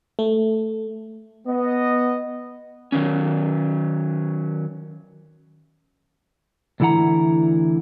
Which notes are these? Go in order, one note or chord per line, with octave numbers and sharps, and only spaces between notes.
A3
B3 D#5
D#3 F#3 C#4
D2 D3 E3 E4 F#5 A#5